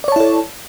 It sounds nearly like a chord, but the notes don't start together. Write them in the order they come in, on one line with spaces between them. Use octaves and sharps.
D5 C#5 A5 E4 A4